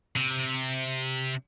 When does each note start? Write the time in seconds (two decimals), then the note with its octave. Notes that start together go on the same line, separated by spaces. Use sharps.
0.16 C3